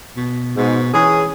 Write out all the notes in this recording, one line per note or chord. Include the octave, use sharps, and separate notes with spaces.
B2
G#2 B2
E3 C#4 G#4